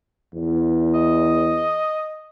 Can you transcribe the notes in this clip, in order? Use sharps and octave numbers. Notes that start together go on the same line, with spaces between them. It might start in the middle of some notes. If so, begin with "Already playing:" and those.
E2
D#5